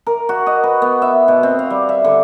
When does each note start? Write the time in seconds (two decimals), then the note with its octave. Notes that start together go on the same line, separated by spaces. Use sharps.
0.07 A#4
0.29 F#4
0.47 D#5
0.64 B4
0.82 B3
1.02 E5
1.28 B2
1.43 C4
1.59 F5
1.70 G3
1.89 E5
2.04 D3